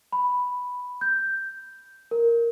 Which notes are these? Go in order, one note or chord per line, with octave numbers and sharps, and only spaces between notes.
B5
G6
A#4